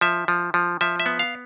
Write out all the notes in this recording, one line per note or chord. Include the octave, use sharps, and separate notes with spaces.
F3 E5
F3
F3
F3 E5
E5
B3
F5